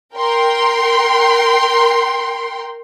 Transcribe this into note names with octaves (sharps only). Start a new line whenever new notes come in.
A#4 G5 C6